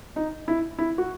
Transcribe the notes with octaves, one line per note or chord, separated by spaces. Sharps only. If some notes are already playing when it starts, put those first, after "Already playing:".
D#4
E4
E4
F#4